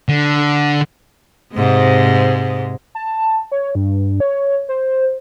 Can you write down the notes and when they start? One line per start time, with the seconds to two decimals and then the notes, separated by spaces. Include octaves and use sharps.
0.09 D3
1.54 G#2 C3 G#3
2.95 A5
3.52 C#5
3.75 G2
4.20 C#5
4.69 C5